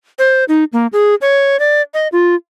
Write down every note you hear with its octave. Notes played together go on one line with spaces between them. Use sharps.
C5
D#4
A#3
G#4
C#5
D5
D#5
F4